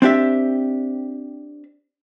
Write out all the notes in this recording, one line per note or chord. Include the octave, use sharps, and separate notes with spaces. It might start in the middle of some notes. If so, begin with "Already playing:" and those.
C4 D4 G4 E5